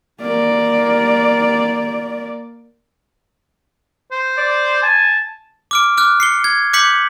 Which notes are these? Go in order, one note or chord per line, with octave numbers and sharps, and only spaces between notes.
A#3 D5
C5
D5
G#5 A5
D6 F6 D7
D6 F6 F#6
C7 C#7 G7
G#6
D6 F#6 G6 B6 C#7 F#7